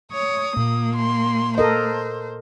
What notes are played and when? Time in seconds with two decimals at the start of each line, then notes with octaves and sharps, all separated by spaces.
0.12 C#5 D#6
0.57 A#2 A#3
0.96 C6
1.58 A4 A#4 C5 D#5